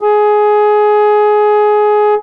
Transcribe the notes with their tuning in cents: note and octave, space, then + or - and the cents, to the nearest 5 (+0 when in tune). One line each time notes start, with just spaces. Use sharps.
G#4 +15